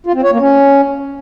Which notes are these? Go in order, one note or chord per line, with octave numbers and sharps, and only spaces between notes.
F4
C4
C#5
A#3
C#4